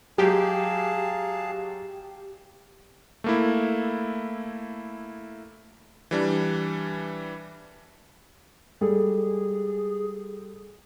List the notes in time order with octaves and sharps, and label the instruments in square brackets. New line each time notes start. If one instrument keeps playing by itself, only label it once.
[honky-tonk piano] F#3 G#3 [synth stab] G4 [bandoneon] G#4 F5 A5
[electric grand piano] A3 A#3 E4
E3 G3 D4
[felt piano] G3 G#3 A4 [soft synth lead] G#4